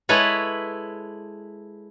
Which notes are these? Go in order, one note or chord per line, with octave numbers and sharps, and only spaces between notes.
G#3 E4 A4 B4 C#5